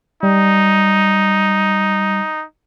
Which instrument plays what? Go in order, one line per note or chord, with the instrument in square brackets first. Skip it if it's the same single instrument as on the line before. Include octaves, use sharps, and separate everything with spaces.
[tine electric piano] G3 [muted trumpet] D#4